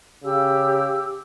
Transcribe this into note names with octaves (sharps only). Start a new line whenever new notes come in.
C#3 G4 E6